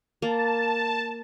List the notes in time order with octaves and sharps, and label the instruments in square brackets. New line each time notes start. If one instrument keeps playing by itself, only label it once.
[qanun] A#3 [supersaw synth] A5